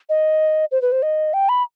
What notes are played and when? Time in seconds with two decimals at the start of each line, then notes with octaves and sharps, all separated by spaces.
0.09 D#5
0.71 C5
0.82 B4
0.92 C5
1.03 D#5
1.34 G5
1.49 B5